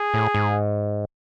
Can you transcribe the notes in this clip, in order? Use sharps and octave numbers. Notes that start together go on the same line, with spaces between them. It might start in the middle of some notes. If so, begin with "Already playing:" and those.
Already playing: G#4
A2
G#2